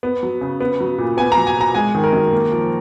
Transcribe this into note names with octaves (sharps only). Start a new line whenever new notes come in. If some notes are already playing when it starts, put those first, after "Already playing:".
B3
F#3
C#3
B3
F#3
A#2
B3 G#5
A#5
F#3
G#5
B2 A#5
G#3 G#5
D#3
A#4
F#2
A#3
F3